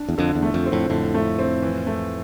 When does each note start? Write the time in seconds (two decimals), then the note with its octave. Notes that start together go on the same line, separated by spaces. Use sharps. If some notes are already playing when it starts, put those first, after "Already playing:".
Already playing: D4
0.09 E2
0.18 F2 D3
0.35 E2
0.42 A3
0.54 F2
0.66 C4
0.72 F2 A2
0.90 F2 A2 D3
1.14 A3
1.39 C4
1.62 E3
1.87 A3